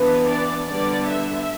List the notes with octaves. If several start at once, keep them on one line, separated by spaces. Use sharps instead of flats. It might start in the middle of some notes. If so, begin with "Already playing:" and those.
Already playing: E3 B3 D4 B4
D5
D3 G3 B3 D5
E5